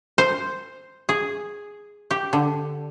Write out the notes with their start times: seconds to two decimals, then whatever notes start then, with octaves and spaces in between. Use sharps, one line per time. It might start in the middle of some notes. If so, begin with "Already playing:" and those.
0.18 C5
1.09 G#4
2.11 G4
2.33 D3